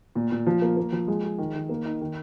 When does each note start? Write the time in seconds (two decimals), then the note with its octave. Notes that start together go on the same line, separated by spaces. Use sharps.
0.15 A#2
0.31 A#2
0.47 F3
0.62 A#3
0.77 A#3
0.92 F3
1.08 G#3
1.24 G#4
1.38 D#3
1.55 D#3
1.69 A#3
1.85 D#4
2.01 D#3